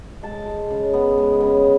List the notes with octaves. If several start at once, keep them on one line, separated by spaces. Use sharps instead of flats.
G#3 A5
G#3
C#3
B3
G#3
C#3